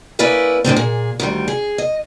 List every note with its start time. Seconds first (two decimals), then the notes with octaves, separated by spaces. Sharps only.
0.19 A#3 C#4 E4 B4 D5 E5
0.65 F#2 A2 D3 C4
0.76 A#2 G#4
1.20 D2 D#3 G3
1.48 G#4
1.78 D#5